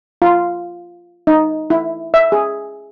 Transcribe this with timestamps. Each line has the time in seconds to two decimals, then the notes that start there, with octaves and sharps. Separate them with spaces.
0.22 F4
1.27 D#4
1.70 E4
2.14 E5
2.32 G#4